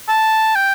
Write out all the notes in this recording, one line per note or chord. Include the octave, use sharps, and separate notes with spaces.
A5
G5